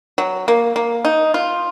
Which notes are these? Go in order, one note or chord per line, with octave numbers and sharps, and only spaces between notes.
F#3
A#3
A#3
D#4
F4